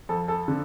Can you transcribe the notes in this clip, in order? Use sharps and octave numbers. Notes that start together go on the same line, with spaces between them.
F2 A4
A4
D3